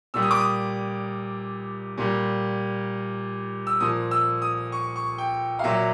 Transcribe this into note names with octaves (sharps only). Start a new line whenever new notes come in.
A#2 G3 E6
D#6
D6
D#6
A#2 G3
E6
A#2 F3 D#6
E6
D#6
C#6
C#6
G5
F5
A#2 F#3 E5